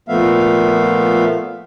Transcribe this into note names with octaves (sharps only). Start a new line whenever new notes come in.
A#2 F3 A3 B3 E5 F5